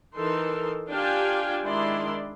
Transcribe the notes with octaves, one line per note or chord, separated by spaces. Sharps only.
E3 D#4 A4 A#4 C6
D4 F4 G4 F5 G5 G#5
D#3 G#3 D4 E4 D5 C6